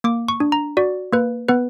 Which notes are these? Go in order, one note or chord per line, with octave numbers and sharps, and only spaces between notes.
A#3 D6
C#6
D4
A#5
F#4 D5
A#3 B4
B3 B4